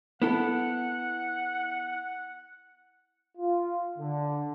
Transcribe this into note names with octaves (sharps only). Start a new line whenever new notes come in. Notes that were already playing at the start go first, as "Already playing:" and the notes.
B3 E4 A4 F#5
F4
D3